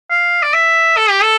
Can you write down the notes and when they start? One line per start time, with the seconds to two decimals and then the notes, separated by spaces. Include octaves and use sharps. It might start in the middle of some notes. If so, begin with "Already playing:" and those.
0.11 F5
0.42 D5
0.54 E5
0.97 A4
1.10 G4
1.23 A4